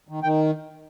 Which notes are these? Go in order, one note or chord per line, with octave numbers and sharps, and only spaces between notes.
D#3
D#3 G5